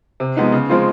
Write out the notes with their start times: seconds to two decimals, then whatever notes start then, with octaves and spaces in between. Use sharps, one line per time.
0.20 C3
0.37 F3 G#3 B3 D#4
0.52 C#3
0.69 F3 G#3 C4 F4